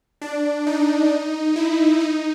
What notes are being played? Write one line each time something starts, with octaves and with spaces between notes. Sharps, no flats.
D4
D#4
E4
D#4